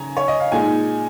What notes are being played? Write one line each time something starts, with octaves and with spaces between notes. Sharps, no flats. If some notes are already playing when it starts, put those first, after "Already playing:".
Already playing: C#3 G#5 A#5
C#5
D#5
F5
A#2 G#3 D#4 G#5